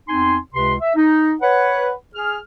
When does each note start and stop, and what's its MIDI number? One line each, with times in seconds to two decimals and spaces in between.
0.08 0.37 40
0.08 0.37 60
0.08 0.37 63
0.08 0.37 80
0.08 0.37 84
0.54 0.74 37
0.54 0.74 48
0.54 0.74 71
0.54 0.74 84
0.81 0.94 76
0.95 1.33 63
1.41 1.91 71
1.41 1.91 73
1.41 1.91 78
2.15 2.38 68
2.15 2.38 89